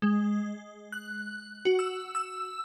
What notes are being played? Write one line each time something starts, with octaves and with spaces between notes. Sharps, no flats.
G#3
F#6
F#4
E6
E6